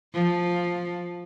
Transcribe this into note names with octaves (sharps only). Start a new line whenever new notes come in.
F3